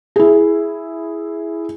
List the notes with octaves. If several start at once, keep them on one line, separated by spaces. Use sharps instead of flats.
E4 G#4